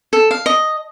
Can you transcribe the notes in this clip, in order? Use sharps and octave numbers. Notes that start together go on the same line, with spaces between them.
A4
F5
D#5